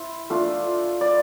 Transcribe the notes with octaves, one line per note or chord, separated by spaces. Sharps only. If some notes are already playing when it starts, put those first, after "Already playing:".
Already playing: E4 C5
A3 D4 F4
D5